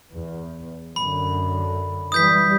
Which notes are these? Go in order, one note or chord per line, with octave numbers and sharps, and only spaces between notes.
E2
F#2 D3 B5
E3 G3 D#6 G6 B6